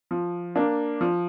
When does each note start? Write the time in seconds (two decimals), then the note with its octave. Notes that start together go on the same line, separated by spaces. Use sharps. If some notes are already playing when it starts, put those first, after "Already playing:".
0.11 F3
0.56 A#3 D4
1.01 F3